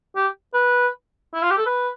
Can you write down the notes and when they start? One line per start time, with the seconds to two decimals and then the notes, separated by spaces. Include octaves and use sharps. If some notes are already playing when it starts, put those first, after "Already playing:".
0.16 G4
0.54 B4
1.34 E4
1.43 F4
1.51 G4
1.58 A4
1.66 B4